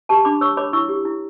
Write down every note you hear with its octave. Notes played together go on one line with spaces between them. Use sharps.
G4 A5 C#6
D4 B5 D6
C#5 C#6 E6
C#5 B5 D6
E4 C#6 E6
G4
E4